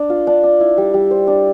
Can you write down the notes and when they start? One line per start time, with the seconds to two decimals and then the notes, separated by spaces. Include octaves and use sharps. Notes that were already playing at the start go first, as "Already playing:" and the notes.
Already playing: D4
0.10 F4
0.27 D4
0.44 D4
0.60 E4
0.78 G3
0.94 G3
1.11 C5
1.27 D4